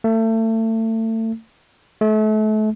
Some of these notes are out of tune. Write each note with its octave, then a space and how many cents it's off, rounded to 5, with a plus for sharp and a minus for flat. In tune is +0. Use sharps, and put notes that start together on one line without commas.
A3 +30
A3 -35